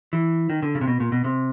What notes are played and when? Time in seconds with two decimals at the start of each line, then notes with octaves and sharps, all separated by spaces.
0.13 E3
0.50 D#3
0.63 D3
0.75 C#3
0.81 C3
0.87 B2
1.00 A#2
1.12 B2
1.24 C3